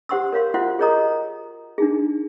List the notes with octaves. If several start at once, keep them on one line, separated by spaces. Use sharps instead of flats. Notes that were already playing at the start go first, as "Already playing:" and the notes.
G4 C5 F#5 C6 C#6 E6
A#4 C#5 F5 C6
F4 F#4 C5 E5 F#5 C6
G#4 A#4 C#5 D#5 A#5 D#6
D4 D#4 G#4